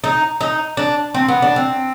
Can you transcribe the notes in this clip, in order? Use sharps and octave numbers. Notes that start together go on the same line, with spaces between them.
D#4
D#4
D4
C4
B3
D4
C4